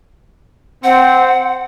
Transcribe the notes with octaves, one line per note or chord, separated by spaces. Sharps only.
C4 F#5